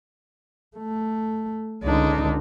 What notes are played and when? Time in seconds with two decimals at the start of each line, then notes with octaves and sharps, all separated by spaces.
0.77 A3
1.83 C#2 D3 D4 D#4